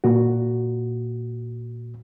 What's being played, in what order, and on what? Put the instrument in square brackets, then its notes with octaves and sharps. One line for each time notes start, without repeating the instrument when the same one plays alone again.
[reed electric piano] A#2 F#4